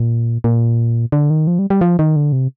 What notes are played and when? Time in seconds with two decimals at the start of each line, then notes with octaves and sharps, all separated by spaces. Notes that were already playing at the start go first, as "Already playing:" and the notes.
Already playing: A#2
0.44 A#2
1.12 D3
1.30 D#3
1.47 F3
1.59 G3
1.70 G3
1.81 F3
1.99 D#3
2.16 D3
2.32 C3